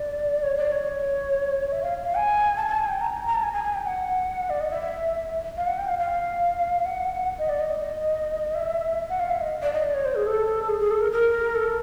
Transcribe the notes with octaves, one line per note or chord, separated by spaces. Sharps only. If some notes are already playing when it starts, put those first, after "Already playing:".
Already playing: D5
C#5
D5
C#5
E5
F5
F5
G#5
A5
A5
G#5
G5
A#5
A#5
A5
G#5
G#5
G#5
G5
F#5
D5
D#5
E5
F5
F#5
G5
F5
F5
F#5
D#5
D5
D#5
E5
F#5
F5
E5
D#5
D5
D#5
D5
C#5
C5
G#4
A4
G#4
G#4
A4
A#4
A#4
A4